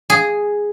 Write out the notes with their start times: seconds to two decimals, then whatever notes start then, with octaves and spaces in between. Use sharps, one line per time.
0.10 G#4